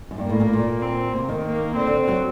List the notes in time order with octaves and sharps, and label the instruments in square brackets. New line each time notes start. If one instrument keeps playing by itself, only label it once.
[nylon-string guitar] F#2
[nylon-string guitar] G2 [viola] A#3
[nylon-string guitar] A2
A#2
A2
A#2
[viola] C4
[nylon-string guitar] C3 [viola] A#3
[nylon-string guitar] D#3
[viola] A#3
[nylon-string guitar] D3 [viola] C4
[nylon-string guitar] D3
F#3